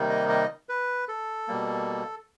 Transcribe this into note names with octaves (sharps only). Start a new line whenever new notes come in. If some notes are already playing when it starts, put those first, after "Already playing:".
Already playing: C3 D#3 G3 A#3 D#4
D#5
D#5
B4
A4
B2 G3 A#3